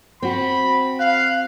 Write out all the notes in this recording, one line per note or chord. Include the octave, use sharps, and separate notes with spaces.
C4 F#4 B5
F5 F#6